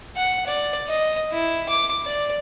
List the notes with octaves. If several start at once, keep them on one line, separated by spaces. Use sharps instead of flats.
F#5
D5
D#5
E4
D6
D5